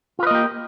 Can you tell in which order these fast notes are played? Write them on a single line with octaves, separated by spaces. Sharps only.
F4 B4 D#5 A#3 G4